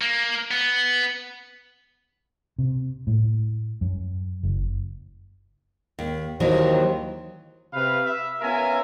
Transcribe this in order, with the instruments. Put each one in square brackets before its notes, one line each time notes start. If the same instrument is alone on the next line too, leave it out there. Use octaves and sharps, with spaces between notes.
[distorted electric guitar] A#3
B3
[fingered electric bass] C3
A2
F#2
F#1
[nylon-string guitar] D#2
[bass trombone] D#2 [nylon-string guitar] D#3 E3 F#3 [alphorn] C5
[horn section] C3 B4 F5
E5
B3 C#4 F4 A#4 E5 G#5